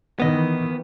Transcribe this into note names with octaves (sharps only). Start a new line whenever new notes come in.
D#3 E3 B3 D#5